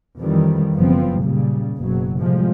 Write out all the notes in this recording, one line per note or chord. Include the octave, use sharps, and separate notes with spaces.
F2 D#3 E3 G3
F#1 F3 B3 C4
A#2 C#3 G3
F#1 B2 F#3
A2 C3 F3 G3 G#3